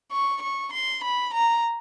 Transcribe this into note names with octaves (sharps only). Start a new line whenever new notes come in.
C#6
C#6
C6
B5
A#5